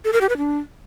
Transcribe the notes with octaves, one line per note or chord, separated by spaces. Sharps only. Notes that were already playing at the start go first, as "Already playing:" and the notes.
A4
A#4
G4
B4
D4